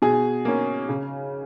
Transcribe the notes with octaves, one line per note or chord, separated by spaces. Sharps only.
B2 G#4
A#3 C#4
C#3